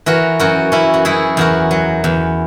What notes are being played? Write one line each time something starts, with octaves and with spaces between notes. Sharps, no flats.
E3 F#4 A#4
F#2 F#4 A#4
E3 C#4 E4
F#4
F#2 E4 G#4
E2 F#4 A#4
F#3
E2